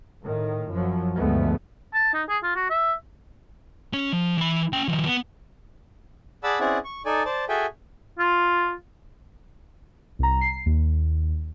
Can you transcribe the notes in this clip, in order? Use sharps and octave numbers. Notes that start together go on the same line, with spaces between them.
A2 D#3
F#2 F3 F#3
D2 G2 F3 G#3 A3 B3
A5
D#4
G#4
F4
F#4
E5
C#4 C#5
F3
E3 B5
C#4 G5
D#3 F3
B3
G#4 D5 F#5 A5 B5 E6
C4 C#4 E4 G#4 D5 F#5
C#6
D#4 A4 D5 G#5
C5 D5 A5
F#4 G#4 A4 E5 G5 G#5
F4
C2 A#5
C7
D#2